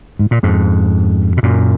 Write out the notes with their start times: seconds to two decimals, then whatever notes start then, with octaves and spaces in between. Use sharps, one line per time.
0.19 G#2
0.31 A#2
0.43 F2 G#2
1.37 B2
1.43 F#2 A#2